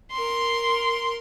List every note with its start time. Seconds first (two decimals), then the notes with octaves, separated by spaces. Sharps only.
0.12 A#4 C6